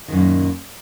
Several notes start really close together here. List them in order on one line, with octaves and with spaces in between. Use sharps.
D#3 F#2 A#2